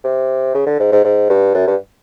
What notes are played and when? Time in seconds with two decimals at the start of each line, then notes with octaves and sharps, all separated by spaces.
0.04 C3
0.54 C#3
0.67 D3
0.80 G#2
0.92 G#2
1.04 G#2
1.30 G2
1.54 F#2
1.67 G2